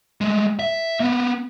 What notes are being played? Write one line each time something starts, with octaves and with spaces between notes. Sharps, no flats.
G#3 A3
E5
A#3 B3